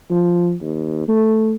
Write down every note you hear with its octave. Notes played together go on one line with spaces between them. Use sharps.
F3
D#2
A3